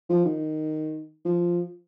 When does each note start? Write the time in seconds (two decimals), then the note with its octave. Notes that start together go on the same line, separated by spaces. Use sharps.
0.09 F3
0.25 D#3
1.25 F3